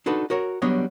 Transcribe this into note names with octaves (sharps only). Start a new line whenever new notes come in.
D4 D#4 F#4 A4 B4
F#4 A#4 C#5
F#3 G3 B3 D4 C#5 D#5